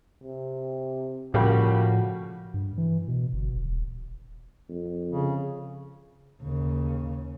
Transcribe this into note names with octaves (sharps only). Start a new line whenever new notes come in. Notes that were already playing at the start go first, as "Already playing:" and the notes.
C3
A2 C#3 F3 G3 A#3 F#4
G2
E3
B2
G1
D#1
F2
C#3
D#2 C#3